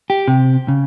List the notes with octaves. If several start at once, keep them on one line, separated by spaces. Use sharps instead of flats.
G4
C3
C#3